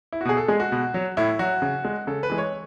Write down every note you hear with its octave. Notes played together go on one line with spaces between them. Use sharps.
E4
F#4
B2 G#4
A4
G#3 G#4
F#4
B2
F#3
A2 E4
F#3 F#4
C#3
G#3
C#3 A4
B4
E3 G#3
C#5